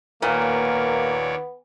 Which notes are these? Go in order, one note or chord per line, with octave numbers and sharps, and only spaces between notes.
D#2 A#2 A#3 B3 C#5 D5